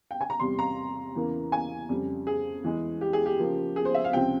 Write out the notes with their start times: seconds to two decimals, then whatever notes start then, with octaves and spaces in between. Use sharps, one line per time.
0.11 G5
0.21 G#5
0.30 A#5
0.40 E2 C3 G3 C6
0.59 A#5
1.15 E2 C#3 E3 A#3
1.52 G#5
1.89 F2 C#3 G3
2.27 G#4
2.64 E2 E3 G#3
3.01 G4
3.13 G#4
3.26 G4
3.39 C#3 F3 A#3
3.76 G#4
3.85 C5
3.94 E5
4.04 F5
4.13 C#2 C3 F3 C4 G5